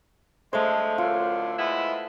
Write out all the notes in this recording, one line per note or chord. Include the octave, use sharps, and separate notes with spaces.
D3 F3 G#3 A3 C5
F#2 A2 D3 F4
G#3 B3 E4